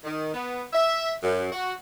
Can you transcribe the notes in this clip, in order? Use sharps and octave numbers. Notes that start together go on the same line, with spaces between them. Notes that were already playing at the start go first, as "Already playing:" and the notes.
D#3
B3
E5
F#2
F#4